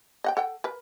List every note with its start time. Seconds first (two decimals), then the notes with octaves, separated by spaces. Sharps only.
0.24 D#5 F#5 G5
0.37 A4 F#5 G5
0.64 A#4 B4